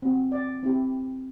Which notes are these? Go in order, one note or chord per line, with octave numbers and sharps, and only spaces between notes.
C4 F#4
D5
C4 E4 G4